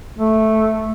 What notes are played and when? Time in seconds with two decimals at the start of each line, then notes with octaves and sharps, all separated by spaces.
0.18 A3